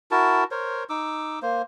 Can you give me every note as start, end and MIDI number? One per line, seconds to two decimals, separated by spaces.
0.11 0.44 64
0.11 0.44 66
0.11 0.44 70
0.11 0.44 81
0.51 0.84 70
0.51 0.84 72
0.51 0.84 73
0.90 1.39 63
0.90 1.39 86
0.90 1.39 88
1.42 1.62 58
1.42 1.62 72